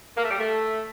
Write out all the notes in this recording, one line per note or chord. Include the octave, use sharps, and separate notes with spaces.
A#3
A3
G3
A3